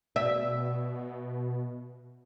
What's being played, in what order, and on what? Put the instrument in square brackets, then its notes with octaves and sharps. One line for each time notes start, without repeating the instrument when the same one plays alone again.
[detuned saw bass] B2 [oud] E5